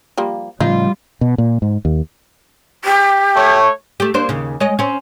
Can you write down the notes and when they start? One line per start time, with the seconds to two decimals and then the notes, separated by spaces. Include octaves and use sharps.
0.18 F3 G3 A#3
0.60 A2 C#3 F3 G3 D#4 F4
1.21 B2
1.38 A#2
1.62 G#2
1.85 D#2
2.85 G4
3.35 A3 C#5
4.00 A3 G4
4.14 A#3 D4 C5
4.29 D#2 C#3
4.60 G#3 C#5 D#5
4.79 C4 C#4